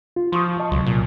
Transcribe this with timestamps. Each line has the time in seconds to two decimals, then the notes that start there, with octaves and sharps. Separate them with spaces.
0.16 F4
0.32 F3 C6 C#6 D#6
0.60 D#5 A5 C#6
0.72 C#2 C3 F#3
0.86 A#2